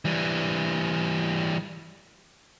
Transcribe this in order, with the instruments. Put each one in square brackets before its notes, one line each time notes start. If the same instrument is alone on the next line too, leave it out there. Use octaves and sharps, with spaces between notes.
[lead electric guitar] E3 G3